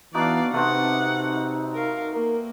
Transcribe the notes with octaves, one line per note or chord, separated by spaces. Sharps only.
E3 B3 D4 D#4 F#4 D5 F5
C3 A3 B3 C4 D#4 F#5
A#4 F5
A#3 A#4